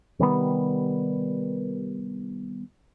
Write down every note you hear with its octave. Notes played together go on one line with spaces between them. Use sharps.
C3 D#3 G3 B3